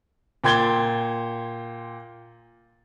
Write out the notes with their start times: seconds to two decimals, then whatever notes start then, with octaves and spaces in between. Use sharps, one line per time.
0.44 A#2 G5 C6 G#6 A6 G7